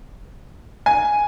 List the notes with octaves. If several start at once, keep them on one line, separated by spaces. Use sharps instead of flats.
G#5